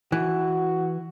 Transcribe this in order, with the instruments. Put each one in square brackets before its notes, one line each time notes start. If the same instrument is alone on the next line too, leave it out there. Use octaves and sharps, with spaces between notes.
[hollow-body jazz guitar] E3 [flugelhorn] F#4